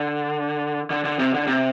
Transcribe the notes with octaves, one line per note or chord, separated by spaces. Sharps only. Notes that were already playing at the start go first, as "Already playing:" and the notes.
Already playing: D3
D3
D3
C3
D3
C3